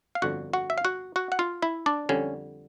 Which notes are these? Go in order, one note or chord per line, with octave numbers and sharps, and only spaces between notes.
F5
G1 F2 D3 F#4 F#5
F#4 F#5
E5
F5
F#4 F#5
F#4 F#5
F#5
F4 F5
E4 E5
D4 D5
F2 D3 G3 C#4 C#5